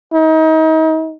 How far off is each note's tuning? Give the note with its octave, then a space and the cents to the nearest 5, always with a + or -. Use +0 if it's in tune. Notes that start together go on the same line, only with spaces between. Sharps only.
D#4 +35